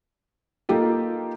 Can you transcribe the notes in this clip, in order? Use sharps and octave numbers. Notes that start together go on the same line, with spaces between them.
A#3 D#4 F4 G4 A4